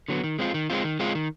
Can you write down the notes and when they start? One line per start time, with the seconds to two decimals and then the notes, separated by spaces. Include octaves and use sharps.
0.08 D3 F#3 B3
0.24 D#3
0.39 G#3 C4 F4
0.54 D#3
0.70 G#3 C4 F4
0.84 D#3
1.00 G#3 C4 F4
1.15 D#3